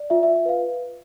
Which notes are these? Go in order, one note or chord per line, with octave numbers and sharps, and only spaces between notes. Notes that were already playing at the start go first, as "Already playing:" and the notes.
Already playing: D5
F4 E5
E5
F4
E5
B4 F5